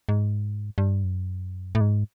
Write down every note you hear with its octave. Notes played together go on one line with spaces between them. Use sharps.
G#2
G2
F#2
A2
G#2